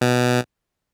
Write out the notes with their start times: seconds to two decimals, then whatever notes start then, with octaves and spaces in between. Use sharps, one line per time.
0.01 B2